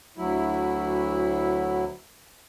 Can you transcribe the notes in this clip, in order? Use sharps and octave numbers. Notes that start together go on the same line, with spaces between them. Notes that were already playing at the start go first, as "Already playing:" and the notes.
D2 F#3 E4